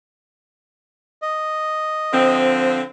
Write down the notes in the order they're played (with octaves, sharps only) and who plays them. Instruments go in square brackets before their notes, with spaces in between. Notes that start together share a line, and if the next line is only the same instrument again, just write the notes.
[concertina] D#5
[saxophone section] D3 F3 C4